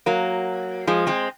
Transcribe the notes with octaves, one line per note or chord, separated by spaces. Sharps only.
F#3 A#3
F3 G#3
G#3 C4